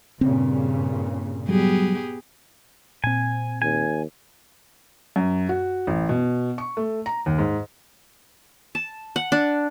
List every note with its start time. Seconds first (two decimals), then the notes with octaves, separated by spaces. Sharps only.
0.21 G2 A#2 C#3 C4
1.49 F#3 G3 B3 G4 G#4
3.04 A#2 C4 G#5
3.62 D#2 G#5
5.16 F#2
5.49 F#4
5.87 A1
6.09 B2
6.58 C#6
6.77 A3
7.06 A#5
7.26 D#2
7.38 G#2
8.75 A5
9.16 F#5
9.32 D4